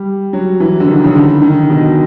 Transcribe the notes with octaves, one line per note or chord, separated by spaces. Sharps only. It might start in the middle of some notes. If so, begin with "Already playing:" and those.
Already playing: G3
F#3
E3
D3
D#3
C#3
D3
D#3
B2